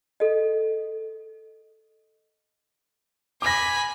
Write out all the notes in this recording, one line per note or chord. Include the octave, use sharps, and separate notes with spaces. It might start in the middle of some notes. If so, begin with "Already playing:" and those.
A4 D#5
G#5 B5 D6 A#6